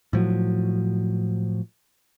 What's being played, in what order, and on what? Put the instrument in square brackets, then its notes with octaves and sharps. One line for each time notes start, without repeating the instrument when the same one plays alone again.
[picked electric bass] A2 F3 F#3